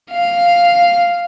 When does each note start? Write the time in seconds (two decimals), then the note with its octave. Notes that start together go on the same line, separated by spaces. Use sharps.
0.11 F5